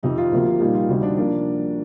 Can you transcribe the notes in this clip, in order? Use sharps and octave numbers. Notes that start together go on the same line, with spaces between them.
F2 C3 D#3 D#4
F4
D2 C3 F3 A#3
A#2 G3 A#3 D#4
F4
D2 C3 G3 D#4
D4
F3 A#3 D4